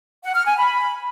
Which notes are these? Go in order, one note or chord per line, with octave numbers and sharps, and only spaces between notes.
F#5
F6
G#5
B5